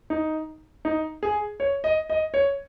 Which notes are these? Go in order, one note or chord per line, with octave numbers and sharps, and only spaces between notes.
D#4
D#4
G#4
C#5
D#5
D#5
C#5